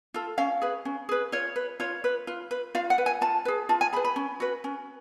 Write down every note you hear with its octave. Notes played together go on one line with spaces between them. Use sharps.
F4 A4
C#4 F5
G#4 B4
C#4
G#4 B4
F4 C#5
B4
F4 C#5
B4
F4
B4
F4 F5
F#5
B4
G#5
F4 A5
G#4 B4
F4 A5
G#5
G#4 B4 B5
B5
C#4
F#4 B4
C#4